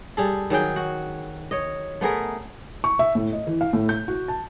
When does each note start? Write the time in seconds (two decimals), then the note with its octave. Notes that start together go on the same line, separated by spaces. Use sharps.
0.17 G3 G#4 A4
0.50 D#3 F#3 G#4 G5
0.76 F#4
1.51 C#5 D#5
2.01 A3 B3 G#4 A#4
2.84 C#6
2.99 E5
3.15 A2
3.33 D#5
3.47 E3
3.61 F5
3.73 A2
3.89 G6
4.08 F#4
4.28 A5